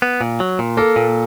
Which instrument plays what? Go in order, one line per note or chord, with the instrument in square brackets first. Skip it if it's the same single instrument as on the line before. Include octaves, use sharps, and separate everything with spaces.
[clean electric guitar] B3
A#2
F#3
A#2
[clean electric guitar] A#3 [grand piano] A4
[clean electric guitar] A#2